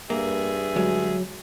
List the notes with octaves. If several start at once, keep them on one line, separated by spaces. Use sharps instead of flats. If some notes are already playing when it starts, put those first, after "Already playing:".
G2 A#3 G#4 E5
D2 F#3 G#3